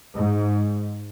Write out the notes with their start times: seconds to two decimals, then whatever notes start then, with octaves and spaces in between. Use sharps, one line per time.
0.15 G#2